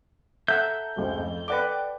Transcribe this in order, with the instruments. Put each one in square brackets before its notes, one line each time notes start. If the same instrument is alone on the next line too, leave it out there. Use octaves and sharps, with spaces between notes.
[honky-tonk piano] A4 A#5 [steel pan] E5 F#5 [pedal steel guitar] G6
[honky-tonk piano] F1 C#2 C4
F2
[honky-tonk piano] A4 D5 G5 [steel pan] B4 F#5 D6